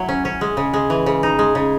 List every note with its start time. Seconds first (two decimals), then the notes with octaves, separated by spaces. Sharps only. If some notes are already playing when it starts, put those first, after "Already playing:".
Already playing: F#3 E4
0.08 C#4
0.25 C#4
0.41 G#3
0.57 C#3
0.73 G#3
0.90 E3
1.06 C#3
1.23 D#4
1.39 G#3
1.55 C#3